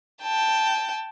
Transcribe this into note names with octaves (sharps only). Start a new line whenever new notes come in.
G5 A5